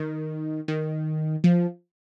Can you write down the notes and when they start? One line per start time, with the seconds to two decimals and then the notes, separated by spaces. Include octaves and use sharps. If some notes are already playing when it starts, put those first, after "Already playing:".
Already playing: D#3
0.68 D#3
1.44 F3